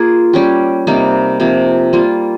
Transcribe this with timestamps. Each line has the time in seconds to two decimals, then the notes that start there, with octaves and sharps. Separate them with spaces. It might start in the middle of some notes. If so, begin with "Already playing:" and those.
Already playing: A#3 F4 G#4
0.33 G3 C#4 G4
0.87 C3 G3 A#3 D#4
1.40 C3 F3 A#3
1.93 G3 A#3 F4